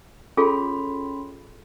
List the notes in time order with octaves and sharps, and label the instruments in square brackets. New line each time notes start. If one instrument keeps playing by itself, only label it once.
[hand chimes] C#4 B5 C6 [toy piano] F4 G#4 A4